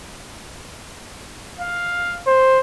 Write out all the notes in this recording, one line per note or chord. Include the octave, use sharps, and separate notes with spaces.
F5
C5